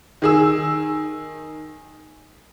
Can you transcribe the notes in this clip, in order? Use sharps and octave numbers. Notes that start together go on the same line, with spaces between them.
D#3 G#4 E6